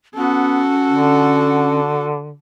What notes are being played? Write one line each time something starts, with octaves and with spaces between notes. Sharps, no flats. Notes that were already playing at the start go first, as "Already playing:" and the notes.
B3 C#4 F#4 A4
D3